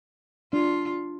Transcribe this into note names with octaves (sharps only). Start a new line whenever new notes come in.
D4 F4